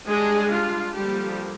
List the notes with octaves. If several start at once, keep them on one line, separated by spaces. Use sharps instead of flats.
G3 G#3 D4 G#4
F4
D3 F3 G3 A#3 G4